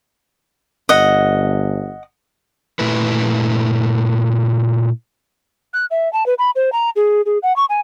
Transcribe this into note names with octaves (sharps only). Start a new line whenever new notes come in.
G1 D#5 F#5
A#2 A3 E4 B4
F#6
E5
A5
B4
B5
C5
A#5
G#4
G#4
F#5
C#6
G#5